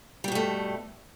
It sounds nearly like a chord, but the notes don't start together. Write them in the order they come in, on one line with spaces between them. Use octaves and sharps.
G3 B2 G2 A3